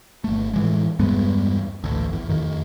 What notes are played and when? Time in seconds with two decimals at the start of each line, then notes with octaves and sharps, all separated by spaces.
0.24 G1 A3
0.54 A2 E3 G#3
0.99 E2 G2 G#3 B3
1.84 A1 D2
2.13 E2
2.29 F2 D#3